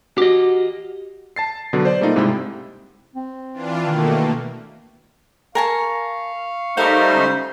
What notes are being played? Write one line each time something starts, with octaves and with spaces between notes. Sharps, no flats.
F#4 G4 D#5
A5 A6 C7
B2 D3 F#3
C5 D5
G3 A3 A#3 D#4 F4
G#2 C3 G#3 E4 G5 B5
C4
E3 D4 F4
B2 D#3 A3 A#3
A#4 F5 G#5 A5 C#6
G3 A3 D#4 A#4 C5 F5 C#6
D3 G#3 C#4